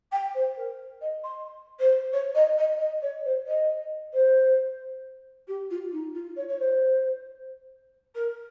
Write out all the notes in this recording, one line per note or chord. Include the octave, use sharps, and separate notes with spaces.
G5
C5
A#4
D#5
C6
C5
C#5
D#5
D#5
D#5
C#5
C5
D#5
C5
G4
F4
D#4
F4
C#5
C#5
C5
A#4